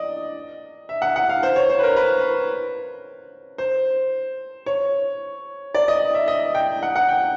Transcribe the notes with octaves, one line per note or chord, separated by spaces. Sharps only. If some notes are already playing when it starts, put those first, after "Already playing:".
Already playing: D5 D#5
E5
F#5
F#5
F5
C5
C#5
C5
B4
A#4
B4
C5
C#5
D5
D#5
E5
D#5
G5
F#5
F#5
G5